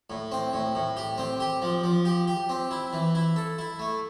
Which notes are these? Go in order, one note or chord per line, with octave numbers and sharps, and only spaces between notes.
A2
C4
A2
A2
G4
C4
G4
F3
F3
G4
G4
C4
E4
E3
E4
A4
E4
A3